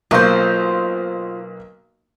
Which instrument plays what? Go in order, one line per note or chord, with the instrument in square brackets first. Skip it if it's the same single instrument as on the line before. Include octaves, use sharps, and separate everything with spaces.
[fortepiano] B1 A#3 C#6 [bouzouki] F4 C5